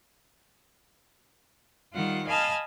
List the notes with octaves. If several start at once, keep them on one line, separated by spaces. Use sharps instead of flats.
D#3 G3 F4 F#5
D#5 F5 G#5 A5 B5 F6